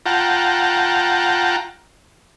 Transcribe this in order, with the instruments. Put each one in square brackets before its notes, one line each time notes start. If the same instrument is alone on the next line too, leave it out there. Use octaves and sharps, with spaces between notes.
[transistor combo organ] F4 F#5 G5 A5 A#5